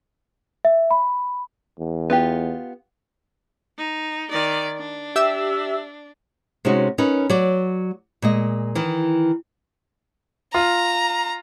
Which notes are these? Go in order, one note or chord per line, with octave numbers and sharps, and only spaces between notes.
E5
B5
E2
B3 F4 G4
D#4
D#3 D5
D4
G4 E5 E6
C3 G#3 C#4 D#4 F#4
C#4 D#4 A#4 B4
F#3 D5
A#2 G#3 D#5
D#3 E3
F4 A#5